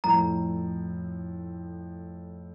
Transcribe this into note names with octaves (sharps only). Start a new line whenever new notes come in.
F2 A2 A#5